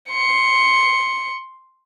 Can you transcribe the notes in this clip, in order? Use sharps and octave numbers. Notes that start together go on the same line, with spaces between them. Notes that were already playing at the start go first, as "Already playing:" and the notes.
C6 C#7